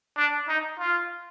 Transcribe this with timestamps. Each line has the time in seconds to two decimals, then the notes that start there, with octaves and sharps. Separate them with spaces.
0.17 D4
0.48 D#4
0.79 F4